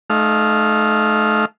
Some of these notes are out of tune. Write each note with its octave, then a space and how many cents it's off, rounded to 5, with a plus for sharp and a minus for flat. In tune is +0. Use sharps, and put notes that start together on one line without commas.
A3 -35 D#4 -15 F5 +0